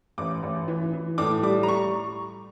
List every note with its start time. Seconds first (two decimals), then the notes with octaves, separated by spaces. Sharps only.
0.18 A1 D6
0.43 A1
0.68 E3
0.94 E3
1.18 A2 D6
1.43 G3 D6
1.63 A#5
1.68 C#6